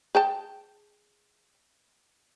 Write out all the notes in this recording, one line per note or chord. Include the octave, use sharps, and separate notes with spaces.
G#4 G5 A5